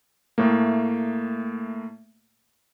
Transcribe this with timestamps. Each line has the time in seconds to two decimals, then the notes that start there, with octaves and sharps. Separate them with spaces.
0.38 A2 A3 A#3